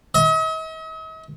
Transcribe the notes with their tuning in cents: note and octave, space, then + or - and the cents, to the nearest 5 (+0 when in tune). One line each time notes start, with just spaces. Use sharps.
D#5 +45